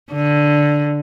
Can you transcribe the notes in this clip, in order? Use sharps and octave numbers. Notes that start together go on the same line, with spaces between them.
D3